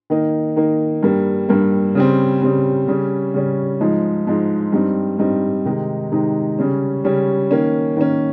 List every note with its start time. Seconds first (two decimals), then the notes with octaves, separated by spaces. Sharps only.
0.10 D#3 A#3 D#4
0.56 D#3 A#3 D#4
1.03 G2 G3 A#3
1.49 G2 G3 A#3
1.95 C#3 G3 C4
2.42 C#3 G3 C4
2.88 C#3 G3 C#4
3.34 C#3 G3 C#4
3.80 G#2 F3 G#3 D#4
4.27 G#2 F3 G#3 D#4
4.73 G2 G3 C4 D#4
5.19 G2 G3 C4 D#4
5.65 C3 D#3 G#3 D#4
6.12 C3 D#3 G#3 D#4
6.59 C#3 G3 C#4
7.04 C#3 G3 C#4
7.51 D#3 A#3 C#4
7.97 D#3 A#3 C#4